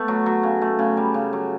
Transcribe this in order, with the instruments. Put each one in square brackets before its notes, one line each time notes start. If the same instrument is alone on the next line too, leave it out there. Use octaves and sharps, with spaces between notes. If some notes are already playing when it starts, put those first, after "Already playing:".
Already playing: [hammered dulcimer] A3 B3
F#3
F#3
C#3
A3
C#3
G3
C#3
F#3